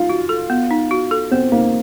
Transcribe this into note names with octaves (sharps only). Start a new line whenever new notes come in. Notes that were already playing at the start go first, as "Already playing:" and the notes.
Already playing: D#4 F4
F#4
A4
B3
D#4
F#4
A4
B3 C4
A#3 D#4